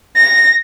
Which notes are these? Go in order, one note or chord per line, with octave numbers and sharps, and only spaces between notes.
A#6